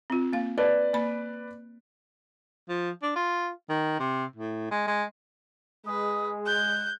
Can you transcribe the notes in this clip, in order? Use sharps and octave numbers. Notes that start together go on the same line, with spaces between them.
C4 F4
A#3 F5
B4 D5 A5
A#3 B5
F3
D4
F4
D#3
C3
A2
G#3
G#3
G#3 B4 D#6
F#6 G6